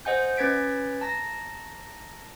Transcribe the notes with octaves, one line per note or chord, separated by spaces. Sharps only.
C5 D#5 F#5 G#5 G6
C#4 B4 G#6 A6 B6 D7
A5 A#5 A#6